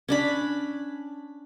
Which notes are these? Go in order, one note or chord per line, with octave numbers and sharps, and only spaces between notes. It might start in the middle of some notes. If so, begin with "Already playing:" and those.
C#4 D4 B5